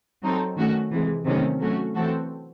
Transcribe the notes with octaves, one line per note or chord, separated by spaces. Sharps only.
F#3 C4 D#4 A4
D#3 A3 C#4 F#4
C3 E3 G#3
C3 D#3 F#3 A3 C#4
F#3 A3 C#4 F#4
E3 A3 C4 F#4 A4